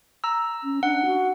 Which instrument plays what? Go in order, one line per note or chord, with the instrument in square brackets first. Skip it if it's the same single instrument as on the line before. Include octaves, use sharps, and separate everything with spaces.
[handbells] A#5 E6
[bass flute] C#4
[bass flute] D4 [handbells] F#5
[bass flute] F#4